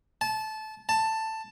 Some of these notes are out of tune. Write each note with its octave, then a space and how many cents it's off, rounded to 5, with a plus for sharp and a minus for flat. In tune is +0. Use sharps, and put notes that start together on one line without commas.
A5 -20
A5 +10